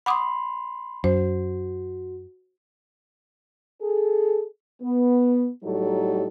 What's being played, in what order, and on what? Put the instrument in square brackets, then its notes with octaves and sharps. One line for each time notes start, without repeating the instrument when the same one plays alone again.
[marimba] F#5 D6 D#6 [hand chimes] B5 C6
[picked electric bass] F#2 [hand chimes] F#4 [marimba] C5
[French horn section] G#4 A4
B3
A2 F#3 G3 D#4 G4 A4